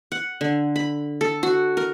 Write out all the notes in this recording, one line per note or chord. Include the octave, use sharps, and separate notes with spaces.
F#5
D3
B5
A4
F#4
A#4